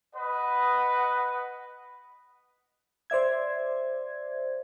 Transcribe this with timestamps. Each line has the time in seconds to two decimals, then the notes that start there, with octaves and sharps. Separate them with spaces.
0.15 B4 D#5 F#5
3.10 C5 D5 E5 G#6